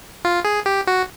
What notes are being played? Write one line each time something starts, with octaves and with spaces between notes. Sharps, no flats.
F4
G#4
G4
F#4